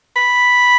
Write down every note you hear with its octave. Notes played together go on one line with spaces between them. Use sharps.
B5